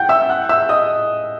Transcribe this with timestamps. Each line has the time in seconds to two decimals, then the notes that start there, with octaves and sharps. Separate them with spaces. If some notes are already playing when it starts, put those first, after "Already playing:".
Already playing: F#5 G5 G6
0.09 E5 E6
0.29 F#5 F#6
0.49 E5 E6
0.69 D#5 D#6